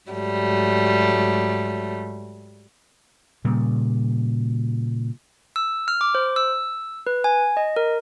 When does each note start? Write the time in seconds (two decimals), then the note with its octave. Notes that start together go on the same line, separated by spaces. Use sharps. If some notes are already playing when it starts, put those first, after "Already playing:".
0.10 G#2 F#3 G3 A3
3.45 A#2 C#3 G3
5.56 E6
5.88 F6
6.01 D6
6.15 C5
6.36 E6
7.07 B4
7.24 G#5
7.57 D#5
7.76 A#4